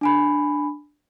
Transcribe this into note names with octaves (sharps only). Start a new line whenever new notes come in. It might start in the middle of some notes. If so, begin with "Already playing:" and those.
D4 G#5 B5